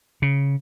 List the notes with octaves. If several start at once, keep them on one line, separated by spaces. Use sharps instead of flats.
C#3